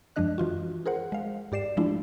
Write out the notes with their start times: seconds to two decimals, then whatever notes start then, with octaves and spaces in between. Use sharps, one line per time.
0.16 F#2 F3 G#3 D4 D#5 F#6
0.38 E3 F4 F#4
0.86 G#4 A#4 C5 F#5
1.12 G#3 F5
1.52 G#2 G4 D5 C7 E7
1.77 F3 G#3 A3 D4 E4 F4